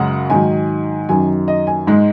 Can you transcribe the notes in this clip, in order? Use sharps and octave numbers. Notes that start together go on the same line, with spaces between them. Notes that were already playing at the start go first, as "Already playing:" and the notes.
Already playing: F#2 C#3 G#3 F#5
G#2 D#3 F#3 G#5
F#2 D#3 F#3 G#5
D#5
G#5
G#2 G#3